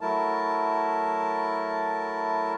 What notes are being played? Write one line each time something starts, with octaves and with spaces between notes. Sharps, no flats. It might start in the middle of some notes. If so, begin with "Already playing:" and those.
F#3 A3 E4 A#4 A5